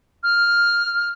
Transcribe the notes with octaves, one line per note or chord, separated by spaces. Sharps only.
F6